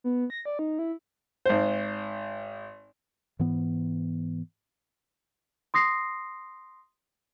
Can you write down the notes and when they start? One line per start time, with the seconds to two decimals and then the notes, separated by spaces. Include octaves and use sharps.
0.04 B3
0.30 A#6
0.45 D5
0.59 D#4
0.79 E4
1.46 G#1 C5
3.39 G#2 E3 B3
5.74 C6 D#6 A#6 C7